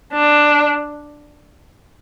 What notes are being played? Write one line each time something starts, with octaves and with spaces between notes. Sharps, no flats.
D4